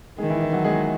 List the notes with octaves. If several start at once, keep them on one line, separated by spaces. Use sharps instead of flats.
D#3 G#3 G#4
E3 E4
E3 E4
F#3 F#4
G#3 G#4